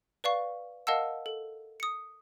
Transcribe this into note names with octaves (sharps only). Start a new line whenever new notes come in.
B4 D5 F5 C#6
A#4 D#5 F5 F#5 A5 E6
A4
D#6 C#7